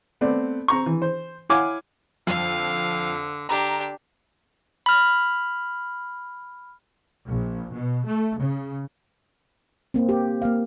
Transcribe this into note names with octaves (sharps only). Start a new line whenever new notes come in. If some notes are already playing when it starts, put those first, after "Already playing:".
A3 B3 C4 D5
C4 A#5 C#6
E3
C5
E4 C#5 F5 F#5 G#5 D6
F2 D3 F5
D3 D4 G4 A#5
B5 F6
A#1
B2
A3
C#3
A#3 C4
G4
A#3 F5